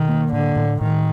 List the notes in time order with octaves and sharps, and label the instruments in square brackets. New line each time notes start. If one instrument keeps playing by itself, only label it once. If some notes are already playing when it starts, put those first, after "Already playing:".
Already playing: [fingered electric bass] B2 [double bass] D#3
[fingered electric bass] A#3
[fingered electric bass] A2 [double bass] D3
[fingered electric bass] A2
[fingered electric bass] A2 [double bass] D#3